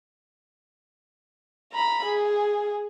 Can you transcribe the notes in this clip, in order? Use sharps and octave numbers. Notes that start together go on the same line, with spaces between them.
A#5 B5
G#4